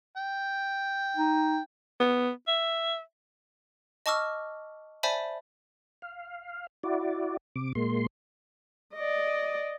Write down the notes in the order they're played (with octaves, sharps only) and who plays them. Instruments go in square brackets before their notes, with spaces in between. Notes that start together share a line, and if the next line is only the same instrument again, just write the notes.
[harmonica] G5
[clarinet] D#4
[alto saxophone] B3
E5
[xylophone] D#5 A5 C#6 D6 E6 F6
C5 D5 E5 G#5 A5 B5
[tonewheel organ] F5
E4 F#4 D5
C3 D6
A#2 G#3 A#3 C6
[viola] D5 D#5